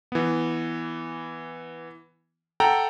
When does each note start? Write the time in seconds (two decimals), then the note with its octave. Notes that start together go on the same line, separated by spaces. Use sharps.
0.12 E3 B3
2.60 A4 F#5 G5 A#5